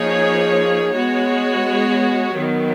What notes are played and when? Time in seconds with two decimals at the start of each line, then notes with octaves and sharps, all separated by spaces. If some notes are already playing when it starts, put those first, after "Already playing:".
Already playing: F3 A#3 D#4 G#4 C#5
0.94 G#3 B3 F#4 C#5
2.36 D#3 F#3 B3